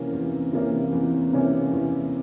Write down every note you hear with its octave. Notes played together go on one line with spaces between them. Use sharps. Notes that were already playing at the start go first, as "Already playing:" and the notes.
Already playing: C3 E3 A#3 C#4
E2
C3 E3 A#3 C#4
E2
C3 E3 A#3 C#4
E2